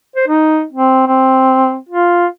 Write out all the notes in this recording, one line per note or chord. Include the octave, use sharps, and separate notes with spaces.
C5
D#4
C4
C4
F4